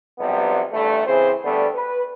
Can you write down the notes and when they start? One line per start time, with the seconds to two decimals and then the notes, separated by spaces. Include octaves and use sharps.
0.19 B1 C3 F3 G3 B3
0.73 A1 G2 A3
1.07 C#3 E3 C4 G#4 C5
1.44 D3 G3 A3 B3
1.75 B4